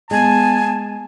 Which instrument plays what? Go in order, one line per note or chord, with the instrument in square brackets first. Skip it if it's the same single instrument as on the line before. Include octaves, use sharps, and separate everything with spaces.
[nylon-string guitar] G#3 [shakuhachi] B3 [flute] G#5 [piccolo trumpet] A5